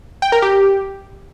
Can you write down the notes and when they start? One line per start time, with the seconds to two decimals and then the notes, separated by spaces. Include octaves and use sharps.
0.22 G5
0.32 A#4
0.42 G4